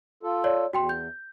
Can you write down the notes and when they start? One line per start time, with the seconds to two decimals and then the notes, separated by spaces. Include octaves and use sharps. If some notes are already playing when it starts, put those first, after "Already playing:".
0.23 F4 A4
0.44 C#5 D5
0.73 E2 F#4 G5 C6
0.89 G6